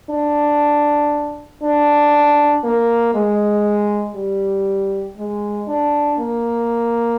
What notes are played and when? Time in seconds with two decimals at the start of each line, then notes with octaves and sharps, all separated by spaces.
0.10 D4
1.63 D4
2.64 A#3
3.14 G#3
4.16 G3
5.18 G#3
5.68 D4
6.19 A#3